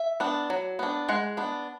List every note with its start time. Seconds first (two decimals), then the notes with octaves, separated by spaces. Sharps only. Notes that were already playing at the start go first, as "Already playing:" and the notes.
Already playing: E5
0.20 B3 D4
0.50 F#3
0.79 B3 D4
1.09 G#3 F#5
1.37 B3 D4